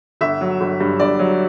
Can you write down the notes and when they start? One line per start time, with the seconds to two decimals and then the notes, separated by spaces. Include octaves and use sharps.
0.21 G1 E5
0.41 F#3
0.61 G1
0.80 G2
1.00 G1 D5
1.19 F#3